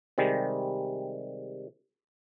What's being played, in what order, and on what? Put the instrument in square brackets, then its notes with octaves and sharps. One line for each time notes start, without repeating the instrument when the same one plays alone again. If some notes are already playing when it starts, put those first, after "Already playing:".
[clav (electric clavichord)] C3 D#3 G3 G#3